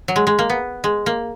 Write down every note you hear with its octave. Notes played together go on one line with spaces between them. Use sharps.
F#3
G#3
G#3
A#3
B3
G#3
A#3